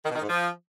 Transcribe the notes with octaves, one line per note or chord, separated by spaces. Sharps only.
D#3
B2
D#3
G#2
F3